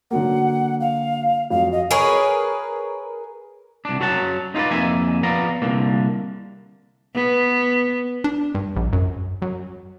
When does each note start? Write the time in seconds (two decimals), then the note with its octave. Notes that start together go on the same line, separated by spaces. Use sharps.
0.11 D3 F#3 A#3 F#5
0.80 F5
1.50 F2 F#3 F5
1.72 D#5
1.91 G#4 A#4 B4 C#5
3.85 C2 D4
4.00 F#2 F#3 C#5 F#5 A5
4.55 D#4 F4 A4 B4 D5
4.71 F2 A#3 E5 G#5
5.23 F3 B3 D5 F5 A#5
5.62 C2 D3 A#3
7.15 B3
8.24 D4
8.55 G2
8.76 A#1
8.93 F#2
9.42 F#2